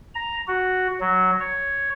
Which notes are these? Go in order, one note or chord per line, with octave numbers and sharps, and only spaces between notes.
A#5
F#4
F#3
C#5